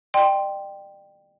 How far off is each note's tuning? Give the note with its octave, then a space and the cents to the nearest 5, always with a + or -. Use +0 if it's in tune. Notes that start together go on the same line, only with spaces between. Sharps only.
D5 +40 G5 +0 C6 +0